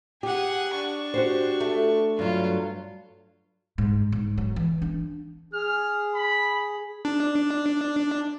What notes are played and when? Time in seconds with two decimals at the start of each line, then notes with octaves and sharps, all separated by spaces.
0.23 G4 G#4 F#5
0.74 D4 C#6
1.14 F#4 G4 C5
1.60 A3
2.19 G2 F#3 F4
3.78 G#2
4.12 G#2
4.38 F#3
4.56 E3
4.82 D4
5.53 G#4 F6
6.15 B5
7.05 D4